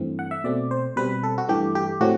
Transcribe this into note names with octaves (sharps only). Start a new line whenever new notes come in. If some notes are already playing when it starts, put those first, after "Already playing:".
Already playing: G2 E3 A3 C4
F#5
E5
B2 A3 C4 D5
C5
B2 G3 C4 B4
A4
F#4
G2 E3 A3 G4
G4
A2 F#3 A3 C4 F#4